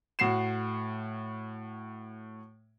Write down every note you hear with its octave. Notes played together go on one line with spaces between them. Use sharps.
A2 F#4 C7 E7